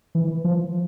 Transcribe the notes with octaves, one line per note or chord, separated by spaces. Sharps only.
E3
F3